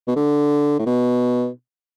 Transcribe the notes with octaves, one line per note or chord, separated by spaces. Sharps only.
B2
D3
A2
B2